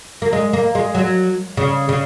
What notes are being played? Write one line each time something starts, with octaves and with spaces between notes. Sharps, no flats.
A#3
G#3
A#3
G#3
F#3
C#3
C#3